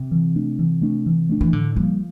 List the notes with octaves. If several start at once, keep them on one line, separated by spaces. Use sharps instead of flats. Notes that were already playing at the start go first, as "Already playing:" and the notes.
Already playing: C3
E3
A3 D4
E3
A3 D4
E3
A3 D4
E3
A2 D3
F3 G3 A#3